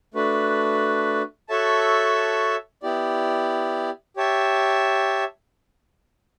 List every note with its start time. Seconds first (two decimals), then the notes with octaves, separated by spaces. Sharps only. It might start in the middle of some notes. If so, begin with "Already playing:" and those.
0.14 A3 D4 F#4 B4
1.49 F#4 A4 C#5 E5 A5
2.83 B3 E4 G4 D5
4.17 G4 C#5 E5 A5